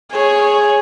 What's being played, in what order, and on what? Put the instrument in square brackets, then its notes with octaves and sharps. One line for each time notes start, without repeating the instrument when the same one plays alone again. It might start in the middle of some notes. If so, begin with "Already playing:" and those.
[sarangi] G#4 [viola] C#5